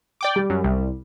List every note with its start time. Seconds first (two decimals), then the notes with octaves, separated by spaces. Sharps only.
0.21 D5 G5 D6
0.36 G3
0.50 F#2
0.64 C2